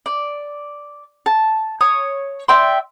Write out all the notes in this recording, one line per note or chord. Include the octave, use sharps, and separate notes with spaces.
D5
A5
C#5 D#6
D5 E5 G5 C6